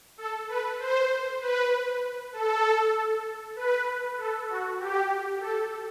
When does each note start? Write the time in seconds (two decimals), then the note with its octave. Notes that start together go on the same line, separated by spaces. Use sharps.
0.18 A4
0.48 B4
0.79 C5
1.41 B4
2.33 A4
3.56 B4
4.18 A4
4.49 F#4
4.80 G4
5.41 A4